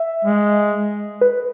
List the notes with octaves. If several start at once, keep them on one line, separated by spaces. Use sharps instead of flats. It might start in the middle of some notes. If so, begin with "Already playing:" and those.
Already playing: E5
G#3
B4